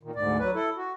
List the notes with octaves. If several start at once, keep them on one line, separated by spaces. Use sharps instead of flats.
A#2 D#3
D2 G#2 D5
F#3 B4
E4 A4
F#4